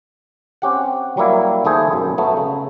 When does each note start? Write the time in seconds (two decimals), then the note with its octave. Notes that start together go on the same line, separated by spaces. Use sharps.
0.62 C4 C#4 G4 F#5
1.17 F#3 G3 A#3 E4
1.65 D#2 A3 E4 G#4 C5
1.93 B1 F#2
2.18 F#3 A3 B3
2.37 C#3